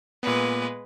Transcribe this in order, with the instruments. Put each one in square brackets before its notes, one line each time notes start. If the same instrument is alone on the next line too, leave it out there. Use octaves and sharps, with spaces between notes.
[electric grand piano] A#2 B3 [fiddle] G#3 B4